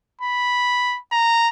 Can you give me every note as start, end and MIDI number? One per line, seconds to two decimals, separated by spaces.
0.21 0.98 83
1.12 1.49 82